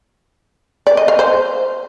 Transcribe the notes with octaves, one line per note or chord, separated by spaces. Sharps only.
D5
D#5
F5
C5